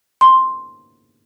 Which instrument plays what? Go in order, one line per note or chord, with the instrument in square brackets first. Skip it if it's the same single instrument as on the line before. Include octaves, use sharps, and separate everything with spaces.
[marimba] C6